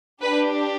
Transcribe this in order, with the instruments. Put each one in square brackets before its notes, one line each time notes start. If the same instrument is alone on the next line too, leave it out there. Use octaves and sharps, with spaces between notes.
[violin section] D4 G4 B4